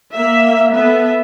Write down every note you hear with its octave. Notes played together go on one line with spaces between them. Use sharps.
A#3 E5
B3 A4 E5